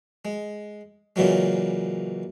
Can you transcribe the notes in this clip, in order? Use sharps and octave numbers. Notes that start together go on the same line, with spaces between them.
G#3
A#2 C#3 E3 F#3 G#3